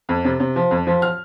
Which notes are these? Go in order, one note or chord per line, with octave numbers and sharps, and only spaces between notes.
F2
C3
C3
F3
F2
F3
F6